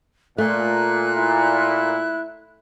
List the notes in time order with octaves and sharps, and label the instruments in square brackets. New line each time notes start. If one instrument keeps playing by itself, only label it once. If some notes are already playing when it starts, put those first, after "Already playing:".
[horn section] A#2 [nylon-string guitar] A3 [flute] F#6
[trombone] E4